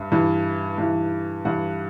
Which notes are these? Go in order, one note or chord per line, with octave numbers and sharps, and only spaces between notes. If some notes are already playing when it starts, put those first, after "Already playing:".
Already playing: G2 E5
G2 E3
G2 E3
G2 E3 F#5